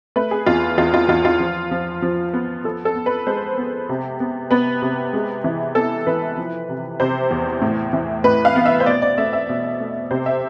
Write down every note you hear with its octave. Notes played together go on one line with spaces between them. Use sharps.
A3 B4
G#4
E2 F4
E2 F4
F4
E2 F4
F4
F3
F3
F3
B3
F3 A4
A4
B3
B4
G#3 C5
B3
C3
B3
B3 B4
C3
G#3
E3
B3 A4
E3 B4
F3
C3
C3 C5
E2
A2
E3
A2 B4
F5
B3
E5
C5
B2 D5
D5
A3 E5
E5
B2
A3
C3 C5
E5